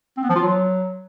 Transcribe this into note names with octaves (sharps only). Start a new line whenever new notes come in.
C4
B3
F3
F4
F#3